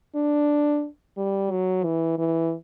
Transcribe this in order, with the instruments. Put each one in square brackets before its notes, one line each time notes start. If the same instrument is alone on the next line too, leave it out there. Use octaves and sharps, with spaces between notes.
[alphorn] D4
G3
F#3
E3
E3